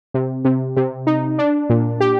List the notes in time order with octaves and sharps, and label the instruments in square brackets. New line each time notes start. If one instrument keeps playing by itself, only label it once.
[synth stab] C3
C3
C3
D#4
D4
A#2
G4